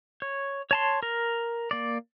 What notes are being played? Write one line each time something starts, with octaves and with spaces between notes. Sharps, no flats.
C#5
C#5 A5 C6
A#4
A#3 D5